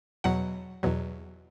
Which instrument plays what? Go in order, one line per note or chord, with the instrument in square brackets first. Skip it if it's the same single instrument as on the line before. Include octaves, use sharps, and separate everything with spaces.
[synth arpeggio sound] E2 B2 F#3 F#5
E2 B2 F#3